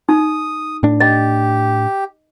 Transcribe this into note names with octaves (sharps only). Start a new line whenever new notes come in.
D#4 D#6
A2 D4
G4 D#5